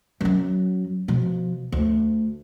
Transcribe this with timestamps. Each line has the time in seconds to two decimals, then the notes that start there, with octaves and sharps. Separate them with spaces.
0.21 F#2 F#3
1.08 B2 F3
1.72 D2